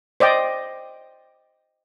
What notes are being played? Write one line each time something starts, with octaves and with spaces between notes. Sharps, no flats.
C5 D5 D#5 G5